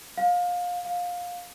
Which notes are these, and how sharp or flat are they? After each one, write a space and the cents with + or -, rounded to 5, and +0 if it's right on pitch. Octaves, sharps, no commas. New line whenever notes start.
F5 +25
F5 +20